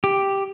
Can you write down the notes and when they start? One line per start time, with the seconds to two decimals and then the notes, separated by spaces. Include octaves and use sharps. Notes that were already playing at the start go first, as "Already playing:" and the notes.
0.04 G4